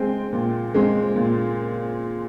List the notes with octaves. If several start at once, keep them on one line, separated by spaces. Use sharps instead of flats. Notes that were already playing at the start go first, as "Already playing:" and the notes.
Already playing: G#3 C4 G5 G#5
A#2
G#3 C4
A#2